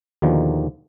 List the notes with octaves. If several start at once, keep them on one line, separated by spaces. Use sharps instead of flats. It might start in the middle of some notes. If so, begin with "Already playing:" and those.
D#2 B2 D3 D#3 F3